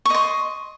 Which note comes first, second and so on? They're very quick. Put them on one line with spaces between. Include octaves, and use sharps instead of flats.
C#6 D#5 C6